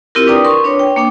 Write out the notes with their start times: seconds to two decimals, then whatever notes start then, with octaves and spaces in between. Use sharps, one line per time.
0.15 C4 E4 F4 G4 A#4
0.27 D4 B4 D5 G5 A#5 D#6
0.44 A#4 C6 C#6
0.64 D4 B4 C#5
0.80 G5
0.96 A#3 D4 G5